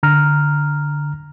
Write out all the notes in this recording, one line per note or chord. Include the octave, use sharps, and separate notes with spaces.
D3 A#5 F6